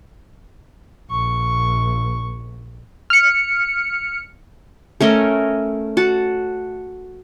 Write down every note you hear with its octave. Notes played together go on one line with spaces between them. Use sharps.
A#1 C#6
F6 C#7
A3 C#4 A#4 D#5
F#4 A5